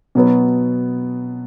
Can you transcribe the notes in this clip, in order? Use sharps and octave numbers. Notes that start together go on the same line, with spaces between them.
B2 F#3 B3